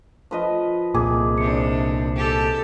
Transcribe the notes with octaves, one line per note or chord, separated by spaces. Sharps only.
F3 B4 D#5
C2 A#2 G#4 D6
C3 D4 C#7
G4 A4